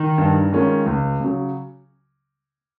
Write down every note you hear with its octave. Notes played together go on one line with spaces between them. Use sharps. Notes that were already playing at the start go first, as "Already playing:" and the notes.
Already playing: D#3
G2
D#3 G#3 C#4 F4
C#2
C#3 F#3